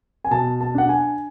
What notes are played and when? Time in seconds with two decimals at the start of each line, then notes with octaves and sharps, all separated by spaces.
0.24 G#5
0.31 B2 A5
0.61 A5
0.74 D4 F#5
0.89 G#5